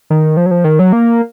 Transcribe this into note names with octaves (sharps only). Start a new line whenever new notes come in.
D#3
F3
F#3
F3
D#3
F#3
A#3